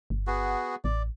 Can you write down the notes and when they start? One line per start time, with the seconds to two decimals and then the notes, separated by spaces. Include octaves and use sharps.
0.10 G1
0.27 B3 F#4 G#4
0.84 A1 D5